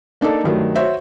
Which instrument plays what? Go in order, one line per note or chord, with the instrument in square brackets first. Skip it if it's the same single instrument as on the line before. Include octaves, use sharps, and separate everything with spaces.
[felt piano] A#3 D4 D#4 A4
G2 D#3 F#3 A3
F#4 C5 C#5 E5